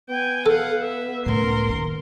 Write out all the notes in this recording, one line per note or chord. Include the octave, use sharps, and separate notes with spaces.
B3 G5 G#5
A4 F5 F#5
E5
C#2 A2 A#4 C6
D#3 A#3